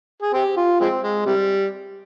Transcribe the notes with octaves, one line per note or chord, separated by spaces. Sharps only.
G#4
C4 G4
F4
F3 G#3 C4
G#3
C3 G3